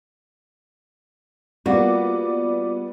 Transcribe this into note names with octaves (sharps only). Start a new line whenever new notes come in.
G3 A#3 B3 F4 F#4 D5 D6